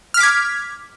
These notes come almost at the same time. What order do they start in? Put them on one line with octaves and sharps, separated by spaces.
F6 B6 D6 G#6